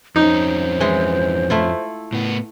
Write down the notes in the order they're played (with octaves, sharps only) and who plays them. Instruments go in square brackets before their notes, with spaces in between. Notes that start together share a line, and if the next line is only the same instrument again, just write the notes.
[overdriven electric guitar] F2 C#4 [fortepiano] D#4 [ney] C5
[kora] E3 G#3
A3 E4 F4
[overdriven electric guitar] A2 B3